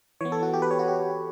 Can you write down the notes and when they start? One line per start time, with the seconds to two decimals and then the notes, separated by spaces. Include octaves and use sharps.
0.21 E3 B3 C#5
0.32 A4
0.43 F#4
0.53 G4
0.62 B4
0.71 C#5
0.79 F#4
0.88 G4